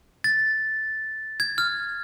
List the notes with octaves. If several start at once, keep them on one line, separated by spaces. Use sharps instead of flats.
A6
G#6
F6